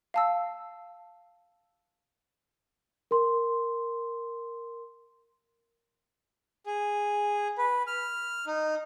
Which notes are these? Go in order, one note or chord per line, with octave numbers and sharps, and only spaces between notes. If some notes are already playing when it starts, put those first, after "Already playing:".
F5 A5 E6
A#4 C6
G#4
B4
F6
D#4